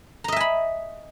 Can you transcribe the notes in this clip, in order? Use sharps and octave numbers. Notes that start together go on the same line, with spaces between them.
D#5 E5 G#5 A#5 B5